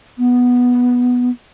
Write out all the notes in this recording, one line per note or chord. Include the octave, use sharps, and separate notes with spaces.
B3